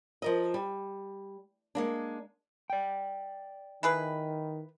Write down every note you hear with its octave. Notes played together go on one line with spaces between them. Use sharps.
F3 A#4 D#5
G3
G#3 A#3 D4
D5 G5
D#3 E4 G#4 B4